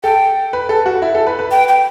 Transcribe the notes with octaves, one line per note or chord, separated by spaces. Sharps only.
A4 G5
B4
A4
F#4
E4
A4
B4
B4
G5
G5